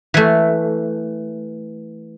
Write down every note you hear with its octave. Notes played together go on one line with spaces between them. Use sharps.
E3 A3